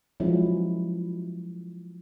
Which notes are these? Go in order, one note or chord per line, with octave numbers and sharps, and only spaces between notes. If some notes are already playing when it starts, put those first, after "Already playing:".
F3 F#3 G#3 C#4 E4